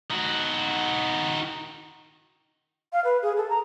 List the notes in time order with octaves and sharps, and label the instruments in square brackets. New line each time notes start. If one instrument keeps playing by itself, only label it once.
[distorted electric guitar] D#3 F#4
[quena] F5
B4
G#4
A4
A#5